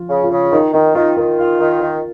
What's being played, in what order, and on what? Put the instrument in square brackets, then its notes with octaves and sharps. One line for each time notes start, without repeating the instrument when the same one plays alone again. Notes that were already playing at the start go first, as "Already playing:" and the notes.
Already playing: [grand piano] F3 F4
[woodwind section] C#3
[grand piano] F4
[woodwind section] C#3
[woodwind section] D#3 [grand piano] D#4
[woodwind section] D#3 [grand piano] D#4
[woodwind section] D#3 [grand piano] F4
[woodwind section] D#3 [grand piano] A#4
[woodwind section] F4
D#3
D#3